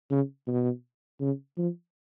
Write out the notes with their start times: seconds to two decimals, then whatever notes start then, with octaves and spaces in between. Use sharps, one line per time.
0.11 C#3
0.47 B2
1.20 C#3
1.57 F3